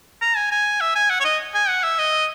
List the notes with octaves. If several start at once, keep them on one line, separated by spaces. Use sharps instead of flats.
A#5
G#5
G#5
E5
G#5
F#5
C#5
D#5
G#5
F#5
E5
D#5